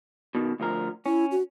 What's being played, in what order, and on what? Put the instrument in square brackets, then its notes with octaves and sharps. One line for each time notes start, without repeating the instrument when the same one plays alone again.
[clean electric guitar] B2 D#3
D2 F3 A#4
[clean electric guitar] C#4 [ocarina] E4
[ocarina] F#4